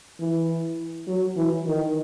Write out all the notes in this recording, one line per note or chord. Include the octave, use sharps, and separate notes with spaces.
E3
F#3
E3
D#3